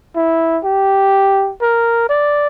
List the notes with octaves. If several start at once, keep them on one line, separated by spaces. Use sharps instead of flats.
E4
G4
A#4
D5